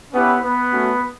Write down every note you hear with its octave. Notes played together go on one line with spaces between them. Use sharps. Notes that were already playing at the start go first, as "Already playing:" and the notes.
B3 C#4 E4 G4 B4
B3 B4
A3 C#4 F#4